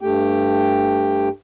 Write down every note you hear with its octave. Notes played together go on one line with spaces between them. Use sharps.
G2 A3 G4 G5